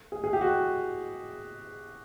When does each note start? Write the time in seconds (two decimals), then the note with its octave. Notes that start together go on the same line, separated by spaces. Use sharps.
0.12 G#4
0.24 G#4
0.33 G4
0.41 F#4